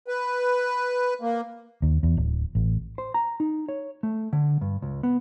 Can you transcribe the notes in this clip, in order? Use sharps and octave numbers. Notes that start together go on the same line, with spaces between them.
B4
A#3
D#2
E2
D1
A1
C5
A#5
D#4
C#5
A3
D3
G2
C#2
B3